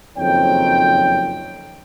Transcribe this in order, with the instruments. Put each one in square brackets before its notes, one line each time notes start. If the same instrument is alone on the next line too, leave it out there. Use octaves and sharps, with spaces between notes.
[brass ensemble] F#1 F2 D#3 C4 C#5 G5